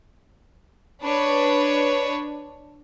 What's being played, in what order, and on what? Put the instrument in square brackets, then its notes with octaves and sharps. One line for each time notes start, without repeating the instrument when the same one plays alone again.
[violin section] D4 B4 C#5